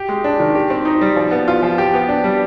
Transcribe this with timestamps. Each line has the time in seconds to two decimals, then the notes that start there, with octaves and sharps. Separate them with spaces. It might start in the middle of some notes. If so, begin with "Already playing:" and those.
Already playing: G4
0.09 G#3
0.24 D4
0.40 D#3
0.55 G4
0.70 C4
0.85 D#4
1.01 G3
1.16 F3
1.32 B3
1.48 F4
1.62 F3
1.78 G4
1.94 B3
2.09 D4
2.24 G3